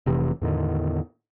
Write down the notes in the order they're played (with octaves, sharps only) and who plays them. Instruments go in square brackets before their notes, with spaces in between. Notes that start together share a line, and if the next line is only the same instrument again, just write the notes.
[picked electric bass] F1 C3 E3
E2 A2 D3 D#3